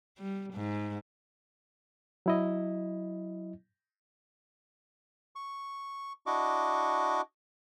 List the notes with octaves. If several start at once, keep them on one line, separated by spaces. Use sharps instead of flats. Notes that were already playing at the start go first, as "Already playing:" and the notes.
G3
G#2
F#3 E4 D#5
C#6
D4 E4 F#4 D#5 C#6 D6